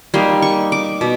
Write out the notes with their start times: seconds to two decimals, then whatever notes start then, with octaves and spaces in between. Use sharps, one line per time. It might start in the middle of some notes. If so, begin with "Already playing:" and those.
0.14 G3 A#3 D#4 C6
0.42 C#6
0.72 D6
1.01 B2